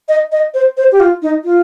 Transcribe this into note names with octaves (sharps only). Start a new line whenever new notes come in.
D#5
D#5
C5
C5
G4
F4
D#4
F4